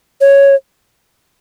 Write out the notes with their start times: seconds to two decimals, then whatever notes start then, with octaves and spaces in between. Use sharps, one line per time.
0.21 C#5